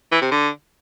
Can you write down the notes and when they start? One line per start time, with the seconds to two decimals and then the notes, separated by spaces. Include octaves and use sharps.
0.12 E3
0.22 C3
0.31 D3